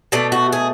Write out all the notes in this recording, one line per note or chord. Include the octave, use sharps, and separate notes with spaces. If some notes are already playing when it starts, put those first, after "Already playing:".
B2 A3 D4
F#4
G#4